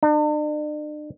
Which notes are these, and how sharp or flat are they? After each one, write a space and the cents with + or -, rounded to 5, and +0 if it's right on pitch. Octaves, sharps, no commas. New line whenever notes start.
D4 +45